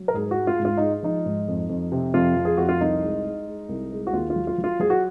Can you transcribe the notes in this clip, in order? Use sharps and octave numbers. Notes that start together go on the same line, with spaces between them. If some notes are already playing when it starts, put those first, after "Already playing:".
Already playing: F#3
A#4
G#2 G#4
F#4
G#3
F4
G#2
F4
G#3 D#4
F3 D#4
G#2
F2
F2
C3
F2 F4
F2
G#4
F2 F#4
F4
C2 D#4
G#3
G#3
G#3
C2
G#3
F#4
D#2 F4
F4
F#3
F4
F#3
F4
F#3 G#4
F#4